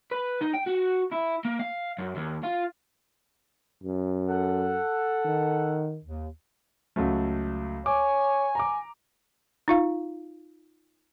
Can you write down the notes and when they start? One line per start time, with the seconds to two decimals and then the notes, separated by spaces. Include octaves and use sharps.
0.11 B4
0.41 D#4
0.54 G5
0.66 F#4
1.12 E4
1.45 A#3
1.60 F5
1.99 F#2
2.16 D#2
2.44 F4
3.84 F#2
4.28 A4 F#5
5.25 D#3
6.04 D#2
6.96 C#2 F#3 A3
7.86 C#5 G#5 D6
8.55 A#5 D6
9.68 D#4 F4 F5